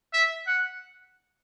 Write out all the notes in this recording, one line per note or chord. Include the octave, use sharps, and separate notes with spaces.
E5
F#5